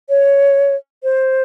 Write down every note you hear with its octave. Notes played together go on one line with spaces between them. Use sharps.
C#5
C5